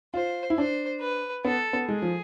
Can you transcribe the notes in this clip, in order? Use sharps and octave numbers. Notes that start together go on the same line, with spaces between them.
F4 C5
E4
D4 C5
B4
B3 A4
B3
G#3 G#4
F3